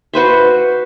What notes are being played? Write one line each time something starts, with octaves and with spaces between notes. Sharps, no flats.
F#4 B4 C5 E5